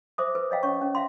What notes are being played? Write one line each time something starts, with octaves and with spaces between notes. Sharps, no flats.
C5 E5 D6 D#6
B4
C#5 D#5 F5 G5
C#4 C#5 C#6
C#4
E5 F5 C6